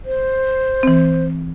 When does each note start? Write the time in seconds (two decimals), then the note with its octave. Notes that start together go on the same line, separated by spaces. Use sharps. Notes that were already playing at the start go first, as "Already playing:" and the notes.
0.05 C5
0.83 E3 C4